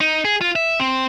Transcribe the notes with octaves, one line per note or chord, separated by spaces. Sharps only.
D#4
G#4
F4
E5
C4